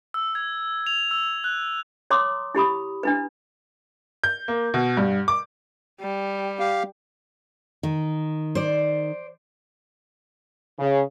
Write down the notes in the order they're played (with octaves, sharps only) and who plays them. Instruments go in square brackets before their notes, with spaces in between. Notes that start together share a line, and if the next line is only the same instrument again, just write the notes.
[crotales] E6
G#6
F7
E6
F#6
[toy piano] C#5 A#5 C6 D6 D#6
E4 G4 B5 D#6
D4 E4 B4
[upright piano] G6
A#3
B2
G2
D6
[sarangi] G3
[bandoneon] G4 F5
[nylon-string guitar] D#3
[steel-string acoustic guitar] C5 D5
[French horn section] C#3